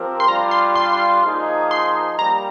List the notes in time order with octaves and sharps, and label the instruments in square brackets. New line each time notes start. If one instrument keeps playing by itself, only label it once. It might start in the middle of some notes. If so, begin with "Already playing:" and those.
Already playing: [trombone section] F3 C4 G4 A#4
[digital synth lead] C6
[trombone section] G3 D4 F4 [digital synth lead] A#5
[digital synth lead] C6
C6
[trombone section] F3 A#3 D#4 G#4
[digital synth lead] C6
[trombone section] G3 A#3 [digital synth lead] A#5